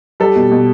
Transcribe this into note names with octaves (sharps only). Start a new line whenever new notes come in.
G3 A4
B2
B2